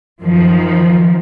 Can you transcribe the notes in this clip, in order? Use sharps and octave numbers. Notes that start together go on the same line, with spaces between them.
F#2 D#3 F3